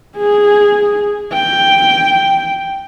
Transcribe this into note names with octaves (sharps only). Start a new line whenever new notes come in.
G#4
G5